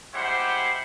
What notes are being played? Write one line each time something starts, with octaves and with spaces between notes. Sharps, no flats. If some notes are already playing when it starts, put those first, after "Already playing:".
G3 G#3 E4 G4 C5 F#5